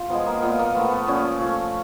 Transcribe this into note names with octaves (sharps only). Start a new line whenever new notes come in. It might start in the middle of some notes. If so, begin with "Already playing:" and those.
Already playing: F4
F3 G#3 B3
A#3
A#2 B3
A#3
F3 A3 B3
B3
A#2 C#4
F3 A3